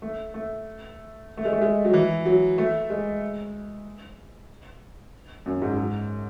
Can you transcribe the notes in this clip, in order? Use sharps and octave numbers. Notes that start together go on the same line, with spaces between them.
A3
A3
A3
G#3
A3
G#3
F#3
E3
F#3
A3
G#3
F#2
G#2
G#2